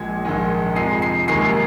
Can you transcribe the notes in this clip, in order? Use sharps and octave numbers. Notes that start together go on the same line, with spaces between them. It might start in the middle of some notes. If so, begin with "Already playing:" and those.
Already playing: A#1 A#2 G#3 G#6
A#1 G#2 D#3 G#3
F2 C3 F3 G#3 C7
C7
F1 D#2 D#3 G#3 C7